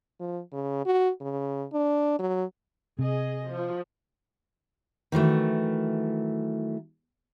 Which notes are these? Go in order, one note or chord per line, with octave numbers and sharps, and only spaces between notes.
F3
C#3
F#4
C#3
D4
F#3
C3 G#4 D#5
F3
D#3 E3 F#3 A3